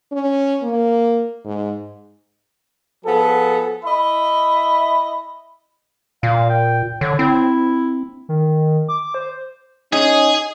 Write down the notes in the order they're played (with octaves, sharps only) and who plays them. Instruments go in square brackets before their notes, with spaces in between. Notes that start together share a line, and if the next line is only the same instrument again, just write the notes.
[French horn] C#4
A#3
G#2
[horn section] F3 B3 G#4 A4
E4 D#5 E5 B5
[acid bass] A#2 [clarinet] F5
[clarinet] G5
[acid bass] D3 [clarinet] C#5
[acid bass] C4 [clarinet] E4
[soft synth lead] D#3
D6
C5
[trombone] C#4 [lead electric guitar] D#4 [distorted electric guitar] G#4